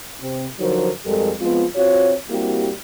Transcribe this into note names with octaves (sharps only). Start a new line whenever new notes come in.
C3 C4
D3 F3 F#3 D#4 A#4 C5
F2 G3 G#3 G4 A4 A#4
F3 G#3 B3 C4 F4
C4 F4 F#4 C#5
G3 A#3 C4 E4 F#4 G4